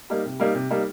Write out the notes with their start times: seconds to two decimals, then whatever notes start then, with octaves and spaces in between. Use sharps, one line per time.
0.10 G3 A#3 D#4
0.25 C3
0.40 G3 A#3 D#4
0.55 C3
0.71 G3 A#3 D#4